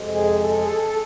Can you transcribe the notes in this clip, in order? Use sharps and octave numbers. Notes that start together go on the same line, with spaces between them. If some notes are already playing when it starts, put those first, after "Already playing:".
Already playing: F2 C3 G#3
G#4
A4
G#4
A4
A4